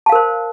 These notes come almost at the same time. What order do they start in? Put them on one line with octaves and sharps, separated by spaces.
A5 F5 A#4 C5